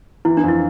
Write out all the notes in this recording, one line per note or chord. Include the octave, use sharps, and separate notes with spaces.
E3 E4
D4
F2 E4